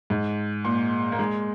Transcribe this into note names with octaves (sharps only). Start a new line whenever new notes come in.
G#2
A#2
A#3
G#3